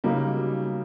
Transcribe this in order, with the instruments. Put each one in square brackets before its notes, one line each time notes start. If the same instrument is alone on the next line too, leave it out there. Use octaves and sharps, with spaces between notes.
[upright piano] C#3 F#3 A#3 D#4 [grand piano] G3